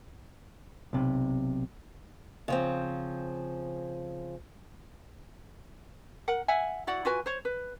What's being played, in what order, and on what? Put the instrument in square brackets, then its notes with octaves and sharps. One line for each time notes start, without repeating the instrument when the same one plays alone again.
[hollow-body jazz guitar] B1 C3
[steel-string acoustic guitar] C#3 F3 C4
[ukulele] A#4 F#5
E5 F#5 G#5
E4 F#4 D5 F#5
F4 F#4 B4 G#5
C5 C#5
B4